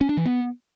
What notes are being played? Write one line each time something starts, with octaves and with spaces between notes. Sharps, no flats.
C#4
D4
E3
B3